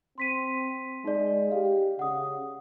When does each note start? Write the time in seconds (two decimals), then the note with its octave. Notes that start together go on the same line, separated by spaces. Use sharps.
0.18 C4 C6 B6 D#7
1.05 G#3 D#4 D5
1.51 G4 F5
1.99 C#3 F#5 D#6